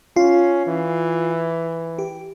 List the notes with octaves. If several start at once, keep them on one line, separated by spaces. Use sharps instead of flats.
C#4 F4
E3
G4